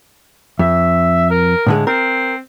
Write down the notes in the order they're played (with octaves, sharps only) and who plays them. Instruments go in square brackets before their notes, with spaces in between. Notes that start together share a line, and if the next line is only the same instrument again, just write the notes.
[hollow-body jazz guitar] F2 [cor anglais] E5
[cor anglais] A#4
[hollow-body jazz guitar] A2 D3 G#3
[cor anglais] C4 [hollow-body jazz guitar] A#4